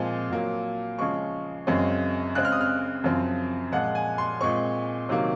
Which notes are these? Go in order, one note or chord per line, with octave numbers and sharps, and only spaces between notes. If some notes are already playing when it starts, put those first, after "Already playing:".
Already playing: A#2 F3 G#3 C4
A#2 F#3 A#3
C#3 F3 G#3 C#6
F#2 C#3 G#3 C4
C#3 G#3 C4 F#6
F6
D#6
F6
F#2 C#3 F3 C4
A#2 F3 G#3 F#5
G#5
C6
A#2 G#3 C4 C#6
C3 D#3 F#3 A#3